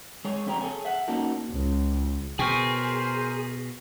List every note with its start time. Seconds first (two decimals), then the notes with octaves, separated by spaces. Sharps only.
0.25 G#3 G#4 C#5
0.46 F2 D3 G4 C5 A#5
0.61 G#4 A4 C#5 G#5
0.85 E5 F#5
1.08 A#3 C#4 D#4 F#4 A4
1.51 C#2
2.39 B2 G#4 A#4 C5 G5 C#6 F6